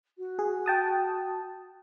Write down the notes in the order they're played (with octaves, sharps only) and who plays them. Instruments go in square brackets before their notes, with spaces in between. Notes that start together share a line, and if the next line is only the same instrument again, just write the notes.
[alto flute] F#4
[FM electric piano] G#4
G5 A5 D#6